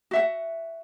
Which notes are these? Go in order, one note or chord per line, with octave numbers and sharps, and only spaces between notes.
F#4 E5 F#5